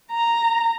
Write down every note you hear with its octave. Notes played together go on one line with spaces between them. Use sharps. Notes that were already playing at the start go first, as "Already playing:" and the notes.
A#5